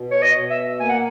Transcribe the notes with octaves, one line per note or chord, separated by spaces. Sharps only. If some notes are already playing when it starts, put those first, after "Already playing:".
Already playing: B2
C#5
D#5
B2
E5
A#3 G#5
F#5